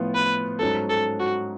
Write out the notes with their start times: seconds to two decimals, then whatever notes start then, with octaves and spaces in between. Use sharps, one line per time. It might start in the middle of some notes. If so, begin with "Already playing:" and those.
Already playing: A2 F3 B3 F4
0.15 B4
0.59 G#2 F#3 C#4 A4
0.90 A4
1.20 F#4